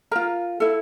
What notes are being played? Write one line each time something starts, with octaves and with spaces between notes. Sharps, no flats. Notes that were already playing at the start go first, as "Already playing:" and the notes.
F4 A#4 A#5
E4 A4